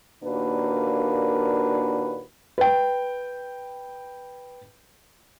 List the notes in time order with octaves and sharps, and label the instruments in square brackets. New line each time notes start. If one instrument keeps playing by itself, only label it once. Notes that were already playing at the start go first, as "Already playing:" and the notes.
[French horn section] D#2 A#2 A#3 D4 F#4 B4
[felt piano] B4 G5